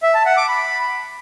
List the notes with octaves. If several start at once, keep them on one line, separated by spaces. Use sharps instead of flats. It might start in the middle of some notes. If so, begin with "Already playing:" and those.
E5
A5
F#5
D6
B5